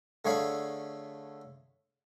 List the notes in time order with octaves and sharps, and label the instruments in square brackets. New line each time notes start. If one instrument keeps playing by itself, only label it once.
[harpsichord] D3 A3 G#4 C#5 F5 B5